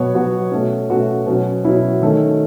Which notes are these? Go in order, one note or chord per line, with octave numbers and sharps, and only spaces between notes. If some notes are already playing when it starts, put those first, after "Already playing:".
Already playing: B2 F#3 B3 C#5
B2 F#3 B3 F#4
B2 A3 C#4
B2 A3 C#4 F#4
B2 F#3 C#4
B2 F#3 C#4 E4
D#3 A3 C#4